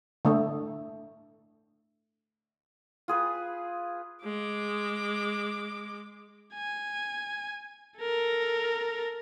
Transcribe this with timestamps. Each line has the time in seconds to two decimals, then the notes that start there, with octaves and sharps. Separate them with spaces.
0.25 D3 A3
3.08 F4 G#4 B4
4.25 G#3 D6
6.55 G#5
8.00 A4 A#4